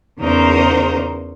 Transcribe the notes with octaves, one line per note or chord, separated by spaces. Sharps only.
E2 C#3 D#4 A#4 C5